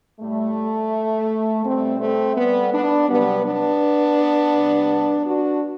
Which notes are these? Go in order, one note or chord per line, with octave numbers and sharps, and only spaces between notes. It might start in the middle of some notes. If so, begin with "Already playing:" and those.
A2 G3 A3
B2 G3 A3 C4
A3 C4
G3 B3
B3 D4
C3 F#3 G3 B3
B3 D4
C3 G3
D4 F#4